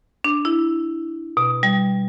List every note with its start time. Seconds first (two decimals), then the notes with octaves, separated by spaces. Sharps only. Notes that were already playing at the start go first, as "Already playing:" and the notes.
0.24 D4
0.45 E4
1.37 B2
1.63 G3